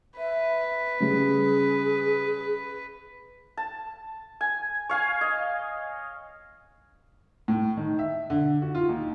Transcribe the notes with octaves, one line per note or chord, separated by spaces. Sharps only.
B4 E5
C#3 G3 G#4
A5
G#5
C#5 F5 G#5
D#5
A2
D#3
E5
D3
F#4
F4
D#2